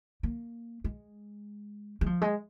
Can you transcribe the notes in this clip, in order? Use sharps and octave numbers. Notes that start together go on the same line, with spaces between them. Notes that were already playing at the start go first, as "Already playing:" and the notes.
A#3
G#3
G#3
F3
G#3